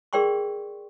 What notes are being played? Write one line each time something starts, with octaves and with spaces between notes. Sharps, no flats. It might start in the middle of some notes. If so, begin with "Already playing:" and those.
G#4 A#4 D5 G5 C6 C#6